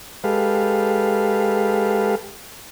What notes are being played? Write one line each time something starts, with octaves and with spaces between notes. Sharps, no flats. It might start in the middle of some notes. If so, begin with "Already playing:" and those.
G#3 G4 A4 B4 F5